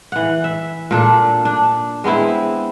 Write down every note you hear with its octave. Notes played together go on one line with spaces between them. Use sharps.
E3 F#5
E5
A#2 D4 A4
D4
G#3 B3 C4 E4